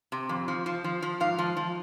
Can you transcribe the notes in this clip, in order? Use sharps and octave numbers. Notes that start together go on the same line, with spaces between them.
C3
F2
F3
F3
F3
F3
G#2 F5
F3
F3